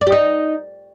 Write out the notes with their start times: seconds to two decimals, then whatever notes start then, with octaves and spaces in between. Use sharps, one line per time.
0.01 D5
0.07 G4
0.12 D#4